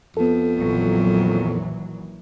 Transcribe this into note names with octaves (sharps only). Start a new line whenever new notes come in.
F2 B3 A4
A#1 D#3 E3 F#3